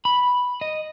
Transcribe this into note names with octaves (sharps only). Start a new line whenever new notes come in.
B5
D#5